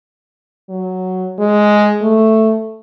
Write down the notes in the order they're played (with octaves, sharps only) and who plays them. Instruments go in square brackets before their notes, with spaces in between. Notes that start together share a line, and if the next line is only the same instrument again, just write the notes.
[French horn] F#3
G#3
A3